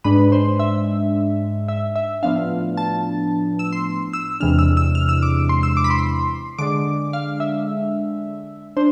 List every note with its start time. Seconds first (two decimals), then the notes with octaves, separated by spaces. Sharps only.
0.04 G#2 G#3 D4 B4
0.32 C5
0.59 E5
1.68 E5
1.96 E5
2.23 A2 F3 B3 D4 F5
2.77 A5
3.59 E6
3.72 C6
4.13 E6
4.40 E2 C3 E3 G#3 D4 F6
4.59 E6
4.77 E6
4.95 F6
5.09 E6
5.22 D6
5.49 C6
5.63 E6
5.77 D6
5.84 B5
5.90 C6
6.59 D3 G#3 D4 D6
7.13 F5
7.40 E5
8.77 D4 C5